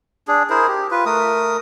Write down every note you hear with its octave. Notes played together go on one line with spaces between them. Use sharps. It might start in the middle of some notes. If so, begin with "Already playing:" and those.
D4 G#4
E4 G#4 A#4 C5
G4
F4 B4
A3 A#4 D#6